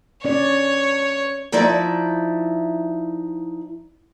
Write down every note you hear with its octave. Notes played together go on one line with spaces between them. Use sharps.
C#4 C#5 D5
F3 D#4 E4 D5 E5